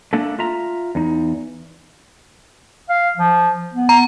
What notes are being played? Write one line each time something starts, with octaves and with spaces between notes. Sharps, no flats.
A3 A#3 D4 A4
F4 E5 A#5
E2 D#4
F5
F3
B3
A#5